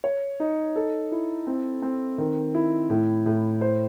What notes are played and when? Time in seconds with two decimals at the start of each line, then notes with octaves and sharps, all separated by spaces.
0.04 C#5
0.40 D#4
0.76 A4
1.12 E4
1.47 C4
1.82 C4
2.18 D#3
2.54 E4
2.90 A2
3.26 A2
3.61 C5